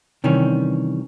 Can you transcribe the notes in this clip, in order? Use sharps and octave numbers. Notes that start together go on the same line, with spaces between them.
C3 D#3 E3 G3 C#4